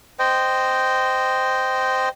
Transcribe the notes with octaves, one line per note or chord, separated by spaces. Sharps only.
C5 D#5 G5